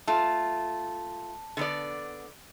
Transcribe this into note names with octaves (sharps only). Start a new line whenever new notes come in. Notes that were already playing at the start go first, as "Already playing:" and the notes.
A3 F4 A5
D3 B3 D5